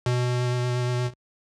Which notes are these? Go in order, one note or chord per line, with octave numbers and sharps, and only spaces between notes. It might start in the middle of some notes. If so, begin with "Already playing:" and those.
B2